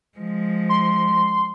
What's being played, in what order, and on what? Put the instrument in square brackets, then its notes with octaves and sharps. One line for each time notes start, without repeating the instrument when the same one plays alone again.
[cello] F3 G#3
[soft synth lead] C6